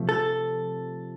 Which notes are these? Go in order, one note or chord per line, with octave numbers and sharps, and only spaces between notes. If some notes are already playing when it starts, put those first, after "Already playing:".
Already playing: C3 F3 A3
A4